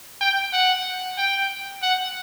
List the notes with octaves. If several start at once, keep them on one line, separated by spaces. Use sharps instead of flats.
G5
F#5
G5
F#5